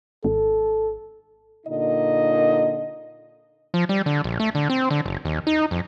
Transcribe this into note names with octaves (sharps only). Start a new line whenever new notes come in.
G#1 A4
A#2 D3 D#4 D#5
F3
G3
D3
A#1
A3
D3
C4
D3
F#1
D#2
D#4
F2